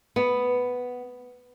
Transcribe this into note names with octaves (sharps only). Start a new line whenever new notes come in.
B3